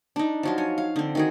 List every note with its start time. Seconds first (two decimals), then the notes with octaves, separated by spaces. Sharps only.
0.16 D4 D#4
0.43 F3 F#3 F4
0.58 C#5 G#5
0.78 F5
0.96 D3 C4
1.15 D#3 F#4 G#4